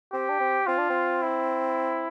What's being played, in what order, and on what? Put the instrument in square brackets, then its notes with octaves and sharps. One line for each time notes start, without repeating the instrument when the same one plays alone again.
[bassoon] C4 [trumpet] G4
[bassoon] D4
C4
[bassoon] C4 [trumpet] F4
[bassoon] D4
C4
[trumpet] E4